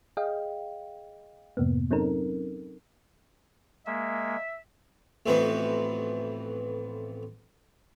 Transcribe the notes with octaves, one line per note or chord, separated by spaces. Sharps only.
G#4 D#5 F5 G5
F2 G#2 C3 A#3 B3
F#3 C4 C#4 D#4 A4 A#4
G#3 A#3 E5
A1 F2 E3 B3 F#4 C5